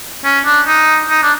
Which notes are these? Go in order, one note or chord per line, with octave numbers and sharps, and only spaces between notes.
C#4
D4
D#4
D#4
D4